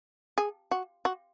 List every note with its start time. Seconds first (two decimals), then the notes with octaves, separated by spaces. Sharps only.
0.38 G#4
0.71 F#4
1.05 F#4